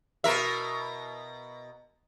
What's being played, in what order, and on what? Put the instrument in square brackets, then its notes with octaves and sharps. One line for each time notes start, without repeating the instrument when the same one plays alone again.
[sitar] B2 A#4 E5